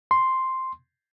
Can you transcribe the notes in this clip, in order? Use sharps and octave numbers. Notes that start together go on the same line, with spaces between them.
C6